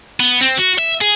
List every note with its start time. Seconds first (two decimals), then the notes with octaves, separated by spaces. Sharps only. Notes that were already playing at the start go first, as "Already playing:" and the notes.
0.20 B3
0.41 C4
0.58 F#4
0.79 E5
1.01 G#4